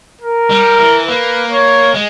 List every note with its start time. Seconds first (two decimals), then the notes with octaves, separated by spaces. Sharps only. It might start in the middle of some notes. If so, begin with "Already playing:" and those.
0.22 A#4
0.50 G3
0.79 E3
1.08 A#3 B4
1.52 C#5
1.94 G#3